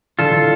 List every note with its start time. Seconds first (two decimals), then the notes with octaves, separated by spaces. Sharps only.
0.19 D3 F4 A4
0.33 D3